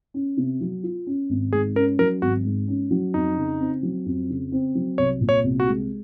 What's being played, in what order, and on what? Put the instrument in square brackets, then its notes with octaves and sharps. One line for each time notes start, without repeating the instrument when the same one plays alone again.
[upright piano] C#4
C3
F#3
F4
C#4
G#1
[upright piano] G#2 [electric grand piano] G#4
[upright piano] C#4 [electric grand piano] A#4
[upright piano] F#3 [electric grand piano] A#4
[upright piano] G#1 [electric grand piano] F#4
[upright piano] G#2
C#4
F#3
[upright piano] F2 [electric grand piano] D#4
[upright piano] C#3
C4
F#3
F2
C#3
C4
F#3
[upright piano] C2 [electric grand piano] C#5
[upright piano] A#2
[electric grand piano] C#5
[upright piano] C2
[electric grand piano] F#4
[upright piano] G#3